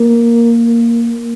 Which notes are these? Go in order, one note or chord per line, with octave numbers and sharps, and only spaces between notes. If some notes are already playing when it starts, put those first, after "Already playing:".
Already playing: A#3